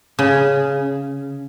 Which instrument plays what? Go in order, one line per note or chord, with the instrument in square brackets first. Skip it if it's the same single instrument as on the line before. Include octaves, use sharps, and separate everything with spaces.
[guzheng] C#3